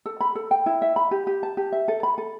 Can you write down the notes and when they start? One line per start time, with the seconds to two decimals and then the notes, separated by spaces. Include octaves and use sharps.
0.06 A4
0.21 B5
0.35 A4
0.51 G5
0.66 E4
0.82 E5
0.96 B5
1.11 G4
1.27 G4
1.43 A5
1.57 G4
1.72 E5
1.88 A4
2.03 B5
2.18 A4